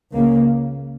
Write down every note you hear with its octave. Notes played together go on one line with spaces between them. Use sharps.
C#2 C#3 A#3